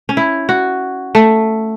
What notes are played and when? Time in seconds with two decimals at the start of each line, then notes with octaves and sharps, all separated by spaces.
0.09 C#4
0.17 E4
0.49 F#4
1.15 A3